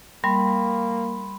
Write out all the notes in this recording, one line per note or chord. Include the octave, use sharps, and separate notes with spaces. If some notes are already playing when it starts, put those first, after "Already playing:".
G3 A#3 B5 C6